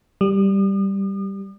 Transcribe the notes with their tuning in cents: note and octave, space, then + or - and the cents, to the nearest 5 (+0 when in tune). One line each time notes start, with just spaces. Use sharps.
G3 +0 D#6 -45